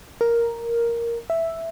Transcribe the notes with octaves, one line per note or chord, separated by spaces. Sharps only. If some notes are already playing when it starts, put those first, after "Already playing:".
A#4
E5